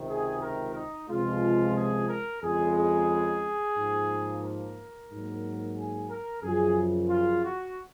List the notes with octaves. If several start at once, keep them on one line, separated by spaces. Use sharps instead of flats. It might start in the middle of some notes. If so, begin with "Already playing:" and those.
Already playing: C#2 C3 D#3
G#4
A#4
D#4
C#2 C3 F3 G#3 F4
G#4
A#4
F2 C#3 G#3 G#4
G#4
G#2 F3 A#3
A#4
G#2 F#3 A#3
G#4
A#4
F#2 C#3 F3 G#4
F4
F#4